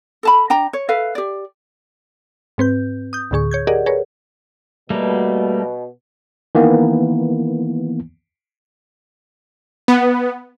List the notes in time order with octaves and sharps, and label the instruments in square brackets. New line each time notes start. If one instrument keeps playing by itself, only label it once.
[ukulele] A4 A5 B5
D4 G5 A#5
C#5
A4 B4 E5 F5
G4 D5
[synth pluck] G#2 C4 B4 G6
D#6 G6
D2 A2 D3 G#4 C#6
C#5 G6 G#6
G4 G#4 A#4 D5 D#5 F#5
G#4 A#4 B4 C#5
[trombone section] B2 [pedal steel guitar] G3 A3 A#3
[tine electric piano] D#3 E3 A#3 B3
[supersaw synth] B3